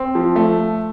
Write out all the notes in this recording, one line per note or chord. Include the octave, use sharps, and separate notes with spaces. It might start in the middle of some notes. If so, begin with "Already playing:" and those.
Already playing: C4
F3
A3